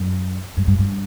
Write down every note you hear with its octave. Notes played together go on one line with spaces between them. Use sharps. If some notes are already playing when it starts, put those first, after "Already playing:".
Already playing: F#2
G2
G2
G2